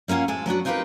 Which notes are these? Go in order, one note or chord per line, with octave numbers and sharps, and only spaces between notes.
G3 A#3 C#4 F4 F#5
D2 A2 G#3 A4 G#5
F#3 B3 D4 F#4
C4 D#4 F4 G4 A#4 B4